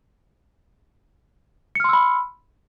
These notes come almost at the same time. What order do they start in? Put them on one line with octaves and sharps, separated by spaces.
C#7 F6 C6 E6 B5